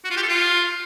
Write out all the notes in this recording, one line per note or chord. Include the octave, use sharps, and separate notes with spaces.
F#4
F4
G4
A4
F4